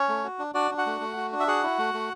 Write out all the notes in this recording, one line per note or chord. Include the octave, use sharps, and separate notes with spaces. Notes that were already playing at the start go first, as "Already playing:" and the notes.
Already playing: C#4 C#5
A3
F#4
D4
D4 F#4 D5
D4
F#4 F#5
A3
A3
F#4
D4
E5
F#4 G#4 F#5
E4
A3
A3